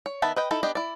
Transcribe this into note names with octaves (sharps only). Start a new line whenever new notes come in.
C#5
D#3 B3 E5 A5 B5
B4 D#5 G5
D#4 E4 A4
B3 D4 G4 D#5
E4 D5